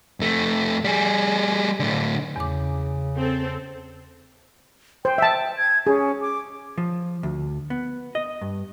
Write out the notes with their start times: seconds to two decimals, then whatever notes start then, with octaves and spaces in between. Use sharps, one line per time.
0.20 F2 A3
0.85 G3 G#4
1.80 A2 D3
2.36 E2 C#3 D6
3.18 C4 A4
5.05 C5 G5
5.18 E5 A5
5.57 G#6
5.87 C#4 G#4
6.21 D6
6.78 F3
7.23 D2
7.70 B3
8.15 D#5
8.41 G2